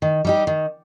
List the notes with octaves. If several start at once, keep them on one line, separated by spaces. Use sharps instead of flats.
D#3
G3 D#4 G4
D#3